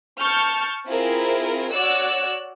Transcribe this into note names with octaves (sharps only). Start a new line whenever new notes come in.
A5 C#6 F6 G6
C4 E4 F4 G#4 A#4
F#4 C#5 D5 E6 F#6